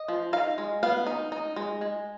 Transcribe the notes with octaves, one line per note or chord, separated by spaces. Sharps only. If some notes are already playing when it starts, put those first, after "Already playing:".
Already playing: D#5
F3
D#4 F5
G#3
B3 F5
D#4
D#4
G#3
G#3